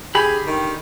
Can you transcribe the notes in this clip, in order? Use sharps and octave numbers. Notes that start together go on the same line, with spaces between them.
D3 G4 G#4 B5
D#3